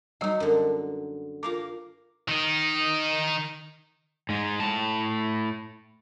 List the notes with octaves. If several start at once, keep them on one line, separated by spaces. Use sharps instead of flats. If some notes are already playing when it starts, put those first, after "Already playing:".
F#3 G3 D#4 D#5
F#2 D3
F4 A#4 F5 A#5 D6
D#3 D#4
G#2 G#3
A2 A5